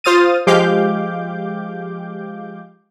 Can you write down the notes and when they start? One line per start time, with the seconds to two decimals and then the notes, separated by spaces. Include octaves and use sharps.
0.04 F4 C5 D#6 F6 A6 D#7
0.47 F3 G#3 G4 F5 D6 G6